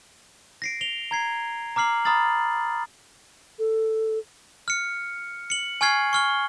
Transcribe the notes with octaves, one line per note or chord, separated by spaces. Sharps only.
A#6 C7 D7
F7 G7
A#5 G#6 C7
A#5 D6 F6 C7 F#7
A#5 B5 D#6 F6 A6 F#7
A4
F6 C#7
C#7 F#7
G#5 C#6 F6 G#6 C7
C#6 F6 G7